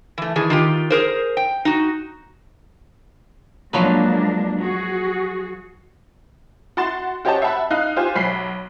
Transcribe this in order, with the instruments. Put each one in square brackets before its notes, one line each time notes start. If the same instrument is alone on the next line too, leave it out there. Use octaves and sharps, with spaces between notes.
[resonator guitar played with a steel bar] E3 A3
D#3 E3 G#4
D#3 F4 G4
G#4 A#4 C5
G5
D#4 F#4
[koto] F3 F#3 B4 [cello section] G#3 A#3 D4
[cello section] F#4 G#4
[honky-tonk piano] F#4 F#5 C6 A6 E7
F#4 G4 C5 C#5 D#5 A5
E5 F#5 A5 B5
D#4 F5 F#6
F4 G4 C5 G#5
B1 B5 B6 C7